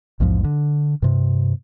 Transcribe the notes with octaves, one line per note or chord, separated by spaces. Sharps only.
A#1 E2 G#2 F3
D3
G2 C3